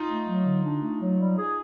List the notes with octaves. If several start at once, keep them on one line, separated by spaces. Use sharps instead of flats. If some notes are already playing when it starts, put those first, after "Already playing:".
Already playing: D#4 F4
A3
F#3
D3
D4
A3
F#3
G3
G#4